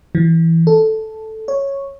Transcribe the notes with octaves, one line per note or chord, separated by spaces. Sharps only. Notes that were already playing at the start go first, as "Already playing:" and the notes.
E3
A4
C#5